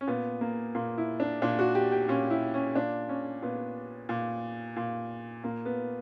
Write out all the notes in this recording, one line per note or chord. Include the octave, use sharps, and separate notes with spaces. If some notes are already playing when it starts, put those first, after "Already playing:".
C#4
A#2 B3
A#3
A#2 A#3
E4
D4
A#2 D4
F#4
G4
G4
A#2 C#4
E4
C#4
A#2 D4
C#4
A#2 B3
A#2
A#2
A#2 A#3
B3